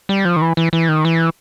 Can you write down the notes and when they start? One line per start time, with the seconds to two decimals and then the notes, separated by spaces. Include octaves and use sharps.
0.09 G3
0.25 F3
0.36 D#3
0.42 E3
0.57 E3
0.73 E3
0.89 D#3
1.05 E3